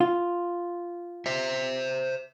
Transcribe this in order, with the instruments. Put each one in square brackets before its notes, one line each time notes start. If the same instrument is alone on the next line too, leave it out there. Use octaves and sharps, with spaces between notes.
[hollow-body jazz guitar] F4
[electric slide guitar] C5 E5